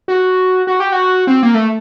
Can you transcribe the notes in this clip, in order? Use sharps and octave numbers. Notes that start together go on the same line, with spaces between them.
F#4
F#4
G4
F#4
C4
A#3
A3